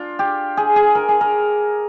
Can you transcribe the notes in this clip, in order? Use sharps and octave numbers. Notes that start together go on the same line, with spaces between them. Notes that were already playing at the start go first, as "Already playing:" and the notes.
Already playing: D4 F4
G4
G#4
G#4
A#4
G#4
A#4